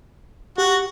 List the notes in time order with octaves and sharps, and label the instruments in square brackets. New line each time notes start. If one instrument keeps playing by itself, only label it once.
[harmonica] F#4 [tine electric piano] G4